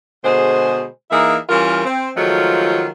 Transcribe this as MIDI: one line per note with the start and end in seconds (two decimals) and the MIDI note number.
0.23 0.84 47
0.23 0.84 50
0.23 0.84 56
0.23 0.84 68
0.23 0.84 72
1.10 1.37 52
1.10 1.37 58
1.10 1.37 63
1.10 1.37 68
1.10 1.37 76
1.49 1.85 52
1.49 1.85 55
1.49 1.85 61
1.49 1.85 65
1.49 1.85 70
1.85 2.09 60
2.15 2.87 51
2.15 2.87 53
2.15 2.87 54
2.15 2.87 56
2.15 2.87 57
2.15 2.87 65